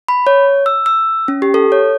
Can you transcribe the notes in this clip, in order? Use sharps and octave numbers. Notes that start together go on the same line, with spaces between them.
B5
C#5
E6
E6
C#4
G4
A4
C#5